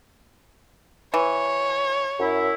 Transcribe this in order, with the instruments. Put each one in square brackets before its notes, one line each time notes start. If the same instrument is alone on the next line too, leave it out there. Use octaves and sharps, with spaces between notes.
[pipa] E3 [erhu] C#5
[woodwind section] F#2 E4